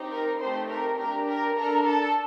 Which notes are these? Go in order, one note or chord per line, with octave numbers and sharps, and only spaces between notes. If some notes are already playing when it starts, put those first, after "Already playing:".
Already playing: C4 D#4 G4
A#4 A#5
A3 C4 D#4 G4 C5 C6
A#4 A#5
D4 G4 A#4 A#5
A#4 A#5
D4 A4 A#4 A#5
A4 A5